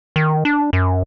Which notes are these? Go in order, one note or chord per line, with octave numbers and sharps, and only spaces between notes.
D#3
D4
F#2